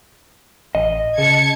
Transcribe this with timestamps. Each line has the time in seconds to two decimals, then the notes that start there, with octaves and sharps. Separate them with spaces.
0.75 A1 D#5
1.18 C#3 A5 G#6 C#7